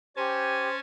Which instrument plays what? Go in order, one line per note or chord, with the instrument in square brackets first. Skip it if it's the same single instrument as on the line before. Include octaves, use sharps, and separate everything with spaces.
[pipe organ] C#4 G#5 A5 [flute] G4 [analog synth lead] C5